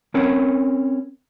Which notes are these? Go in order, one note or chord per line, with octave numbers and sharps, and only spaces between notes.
C4 C#4 A#4 C#5